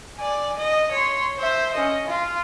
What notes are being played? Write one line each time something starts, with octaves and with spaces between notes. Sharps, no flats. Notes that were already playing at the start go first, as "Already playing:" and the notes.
D5 G#5
D#5
C#5 C6
C5 E5
C#4 D#5
F4